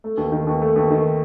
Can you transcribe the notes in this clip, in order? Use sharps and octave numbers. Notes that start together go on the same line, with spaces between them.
A3
D#2
D#3
D#2
A3
D#2
D#3